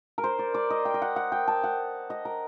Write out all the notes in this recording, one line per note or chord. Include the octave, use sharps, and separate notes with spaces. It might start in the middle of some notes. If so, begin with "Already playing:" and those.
A#4
C5
D5
D5
D#5
G5
D#5
F#5
F#5
G5
A5
F#5
D#5
A#4